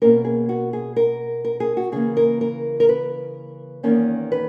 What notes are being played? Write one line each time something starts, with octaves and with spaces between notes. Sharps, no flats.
B2 A#3 C#4 A#4
G#4
F#4
G#4
A#4
A#4
G#4
F#4
C#3 E3 A#3 G#4
A#4
A#4
A#4
B4
E2 D#3 A#3 C#4
B4